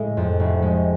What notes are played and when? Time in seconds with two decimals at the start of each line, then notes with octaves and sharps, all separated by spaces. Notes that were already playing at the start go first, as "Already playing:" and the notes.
Already playing: A2 G#3
0.17 F2
0.40 F1
0.62 G#3